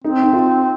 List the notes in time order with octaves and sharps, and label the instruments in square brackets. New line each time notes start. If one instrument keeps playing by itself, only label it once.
[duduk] C4 [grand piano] D#4
[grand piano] D#4
F4